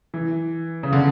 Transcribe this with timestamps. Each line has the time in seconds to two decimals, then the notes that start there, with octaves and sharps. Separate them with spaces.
0.14 E3
0.83 C#3
0.93 D3